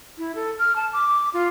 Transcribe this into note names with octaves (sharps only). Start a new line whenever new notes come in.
E4
A4
F6
A5
D6
F4